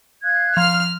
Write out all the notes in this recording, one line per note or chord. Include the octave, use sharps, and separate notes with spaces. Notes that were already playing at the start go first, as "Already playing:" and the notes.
F5 F#6 G#6
F3 F5 F6